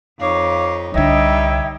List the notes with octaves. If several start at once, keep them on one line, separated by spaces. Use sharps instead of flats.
F2 D#4 C#5 F5 D6
C2 D3 G3 D#4 C#5 D#5 E5 G5